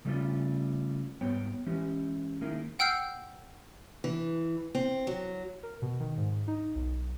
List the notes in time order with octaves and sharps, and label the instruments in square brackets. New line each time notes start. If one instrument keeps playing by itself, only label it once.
[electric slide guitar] C#3 G3 A3 C4 C#4 F4
G#2 G3 B3 C#5 G5
E3 G#3 C#4 G4
D#3 G#3 A#3 E4
[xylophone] F#5 G5 E6 F6 G6 C7
[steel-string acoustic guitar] E3
C4
F#3
[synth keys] A#4
B2
D#3
G#2
D#4
B1